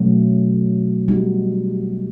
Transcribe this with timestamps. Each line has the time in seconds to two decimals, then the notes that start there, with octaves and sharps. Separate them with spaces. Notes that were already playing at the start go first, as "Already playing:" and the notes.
Already playing: B2 F#3 A3 C#4
1.08 G3 B3 D#4 F#4